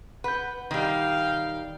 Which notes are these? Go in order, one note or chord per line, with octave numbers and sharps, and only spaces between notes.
B4 F#5 B5 G6
D#3 G3 F5 G5